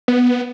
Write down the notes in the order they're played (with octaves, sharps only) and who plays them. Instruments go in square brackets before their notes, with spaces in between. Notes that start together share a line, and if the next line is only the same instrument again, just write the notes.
[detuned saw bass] B3